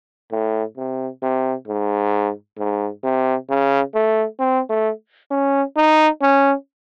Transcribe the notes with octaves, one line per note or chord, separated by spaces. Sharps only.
A2
C3
C3
G#2
G#2
C3
C#3
A3
C4
A3
C#4
D#4
C#4